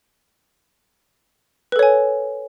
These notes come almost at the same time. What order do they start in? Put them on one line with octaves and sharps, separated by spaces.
B4 A4 C#5 G#5